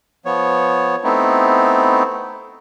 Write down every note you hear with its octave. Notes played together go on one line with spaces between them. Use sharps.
F3 B3 C#5
A3 B3 C4 D#4 E4